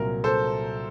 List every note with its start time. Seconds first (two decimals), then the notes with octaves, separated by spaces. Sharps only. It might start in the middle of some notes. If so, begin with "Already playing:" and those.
Already playing: C2 A#2 F#3 A#4
0.24 A4 C5